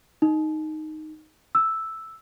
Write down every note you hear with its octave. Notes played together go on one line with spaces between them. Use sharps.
D#4
E6